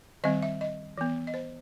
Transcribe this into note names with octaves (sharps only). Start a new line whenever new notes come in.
D#3 G3 C4 D#5
E5
D#5
E3 B3
D#5
C5